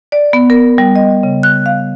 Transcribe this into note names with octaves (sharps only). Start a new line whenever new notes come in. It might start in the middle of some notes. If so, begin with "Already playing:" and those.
D5
B3
A#4
G3
D#5
C#3
F#6
F5